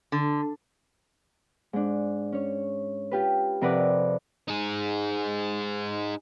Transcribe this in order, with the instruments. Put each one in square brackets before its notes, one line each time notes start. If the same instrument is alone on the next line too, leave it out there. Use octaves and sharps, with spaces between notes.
[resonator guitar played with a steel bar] D3
[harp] G#2 D4
C#4 C#5
F4 G4 B4
F2 C3 A#4 B4 D5 F#5
[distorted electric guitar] D#4 G#4